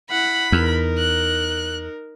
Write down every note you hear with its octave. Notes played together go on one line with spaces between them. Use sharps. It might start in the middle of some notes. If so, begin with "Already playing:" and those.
E4 F#5 B5
E2 D#4 A#4
F#6